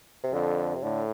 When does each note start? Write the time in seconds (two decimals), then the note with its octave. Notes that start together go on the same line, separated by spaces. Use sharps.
0.23 C3
0.33 F2 D3
0.75 C3
0.82 A2 D3